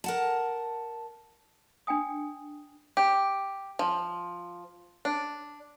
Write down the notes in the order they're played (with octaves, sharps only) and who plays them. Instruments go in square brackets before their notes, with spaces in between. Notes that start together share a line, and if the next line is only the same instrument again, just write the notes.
[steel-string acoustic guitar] A#4 F#5 A5
[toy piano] D4 G5 G#5 D#6
[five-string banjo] G4
F3
D4